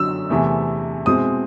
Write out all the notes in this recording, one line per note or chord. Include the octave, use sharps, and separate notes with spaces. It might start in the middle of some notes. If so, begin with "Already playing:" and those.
Already playing: F#2 D3 F#3 E6
E2 C3 E3 A3
B2 G#3 C4 E4 D#6